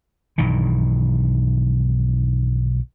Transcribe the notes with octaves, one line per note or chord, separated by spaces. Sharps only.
B1 G2 D#3 E3